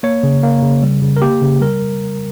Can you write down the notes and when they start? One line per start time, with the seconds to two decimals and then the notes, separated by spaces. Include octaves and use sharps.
0.03 A#3 C#5
0.23 C#3
0.43 A#3
0.62 C#3
0.82 G3
1.02 C#3
1.17 A#4
1.22 A#3 G4
1.41 C#3
1.61 G3 A#4